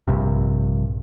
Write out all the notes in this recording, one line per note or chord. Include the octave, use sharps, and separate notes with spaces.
A#1 G2 C3